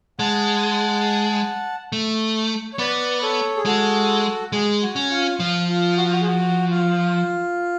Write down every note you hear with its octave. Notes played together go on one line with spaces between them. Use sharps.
G#3 F#5 A5
A3
C#5
B3 B4 D5
A4 C#5
G#4
G#3 F#4 A4
G#3 G#4
F#4
C#4
F4
F3 F4
F4
F#4
F4
F#4
G#4
F#4
F4